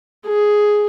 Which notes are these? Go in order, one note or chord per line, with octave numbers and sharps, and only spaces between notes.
G#4